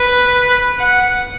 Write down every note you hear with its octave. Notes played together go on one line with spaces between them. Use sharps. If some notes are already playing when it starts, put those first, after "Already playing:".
Already playing: B4
F#5